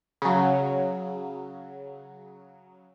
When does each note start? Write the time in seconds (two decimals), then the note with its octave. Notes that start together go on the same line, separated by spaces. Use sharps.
0.22 C#3 F#3